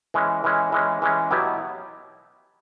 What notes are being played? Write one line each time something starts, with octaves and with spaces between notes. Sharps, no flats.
E3 G#3 C#4
E3 G#3 C#4
E3 G#3 C#4
E3 G#3 C#4
B2 F#3 B3 E4 G4